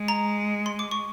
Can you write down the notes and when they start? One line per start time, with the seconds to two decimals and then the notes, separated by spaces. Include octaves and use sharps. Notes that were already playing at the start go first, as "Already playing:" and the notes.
Already playing: G#3
0.08 A#5
0.66 C6
0.79 D6
0.91 C#6